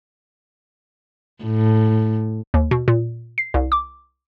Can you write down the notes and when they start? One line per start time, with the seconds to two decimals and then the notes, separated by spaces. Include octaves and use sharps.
1.44 A2
2.54 D#2
2.71 B2
2.88 A#2
3.38 C7
3.54 C2
3.72 D6